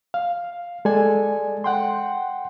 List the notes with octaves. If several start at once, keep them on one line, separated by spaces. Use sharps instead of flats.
F5
G#3 A4 D5 G#5
F#5 G5 C6